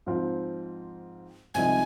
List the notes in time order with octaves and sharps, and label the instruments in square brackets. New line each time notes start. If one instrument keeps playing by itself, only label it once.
[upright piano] G#2 F3 C4 F4
[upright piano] C2 C3 F3 G#3 D#4 [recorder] G#5